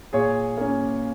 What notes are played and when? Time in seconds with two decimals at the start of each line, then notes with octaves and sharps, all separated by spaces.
0.13 A#2 G#4 C#5
0.58 A#3 C#4